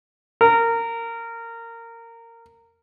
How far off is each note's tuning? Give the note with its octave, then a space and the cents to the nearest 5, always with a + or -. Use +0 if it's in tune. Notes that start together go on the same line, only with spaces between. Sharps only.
A#4 -20